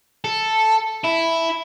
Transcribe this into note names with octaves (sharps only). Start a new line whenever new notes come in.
A4
E4